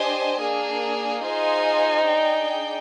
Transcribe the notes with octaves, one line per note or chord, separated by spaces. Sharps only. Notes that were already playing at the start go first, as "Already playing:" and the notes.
Already playing: D4 G4 C5 D#5 G#5
A#3 D4 G#4
D#4 F4 G#4 C5 D#5 G#5
D4 G#4 D5 G5